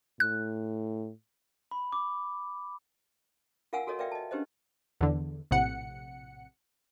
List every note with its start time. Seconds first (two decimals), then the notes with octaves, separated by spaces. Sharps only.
0.20 A2 F#6
1.71 B5
1.92 D6
3.73 F4 A#4 F5 F#5 G#5 E6
3.87 F#4 A4 A#4 C#5 D#5
3.99 A#4 B4 D5 E5 F5 G5
4.12 D#5 A5
4.31 C#4 D4 G4 B4 C5 D#5
5.01 E2 D3
5.51 A#1 A2 C3 F#5 C#7